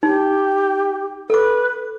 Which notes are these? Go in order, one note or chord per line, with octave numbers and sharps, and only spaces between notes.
D#4 G4
A4 B4 D6